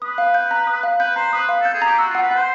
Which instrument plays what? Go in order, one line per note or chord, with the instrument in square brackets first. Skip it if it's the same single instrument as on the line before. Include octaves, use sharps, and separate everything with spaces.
[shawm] B4 [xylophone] D#6
[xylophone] F5
G6
A#5
D#6
F5
[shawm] B4 [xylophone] G6
[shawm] C5 [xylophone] A#5
[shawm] B4 [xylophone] D#6
[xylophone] F5
[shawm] A4 [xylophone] G6
[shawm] G#4
[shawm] G4 [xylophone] A#5
[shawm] F#4 [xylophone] E6
[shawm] F4 [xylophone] F#5
[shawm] B4
[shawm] C5 [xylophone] F#5